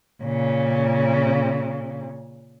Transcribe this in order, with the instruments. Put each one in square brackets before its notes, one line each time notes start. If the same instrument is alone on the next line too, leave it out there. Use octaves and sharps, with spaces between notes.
[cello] A#2 C#3